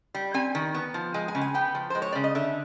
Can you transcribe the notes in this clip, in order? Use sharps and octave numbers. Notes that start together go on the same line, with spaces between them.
G3
C4 G#5
D#3
B3
F3
G#3 G#5
G#5
C#3
G#5
B3 G5
F3
G#3 C5
C#5
C#3 D5
D#5
D3 E5